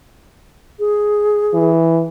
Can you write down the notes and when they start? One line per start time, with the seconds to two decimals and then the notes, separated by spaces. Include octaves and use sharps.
0.79 G#4
1.54 E3